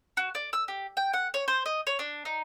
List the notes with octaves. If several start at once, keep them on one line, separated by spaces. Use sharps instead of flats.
F#4
D5
E6
G4
G5
F#5
C#5
C5
D#5
C#5
D4
D#4